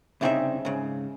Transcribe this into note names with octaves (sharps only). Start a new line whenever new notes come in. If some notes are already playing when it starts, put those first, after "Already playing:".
C2 G2 C#3 C4 D#4 E5
G#2 C#3